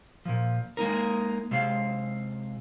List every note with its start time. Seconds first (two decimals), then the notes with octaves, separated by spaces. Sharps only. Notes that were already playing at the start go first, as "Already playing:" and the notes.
0.25 A#2 F3
0.77 G#3 A#3 D#4 A#4
1.51 C3 G#3 G4 F5